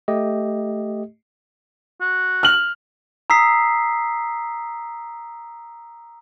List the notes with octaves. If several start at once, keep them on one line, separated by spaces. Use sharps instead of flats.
A3 G4 D#5
F#4
F6 F#7
A#5 D#6 E6 B6 C7